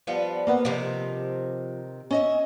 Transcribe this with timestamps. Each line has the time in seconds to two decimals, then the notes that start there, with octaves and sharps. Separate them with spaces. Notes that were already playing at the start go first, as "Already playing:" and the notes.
0.07 F3 G3 B3
0.47 A#3 B3 F#5
0.65 C3 D#3 F3
2.11 C#4 D#5 E5